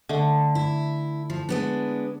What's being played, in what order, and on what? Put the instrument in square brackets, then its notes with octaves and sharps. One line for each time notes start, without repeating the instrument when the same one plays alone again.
[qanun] D3 A3
[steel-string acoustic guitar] E4
F3
G#3 B3 D4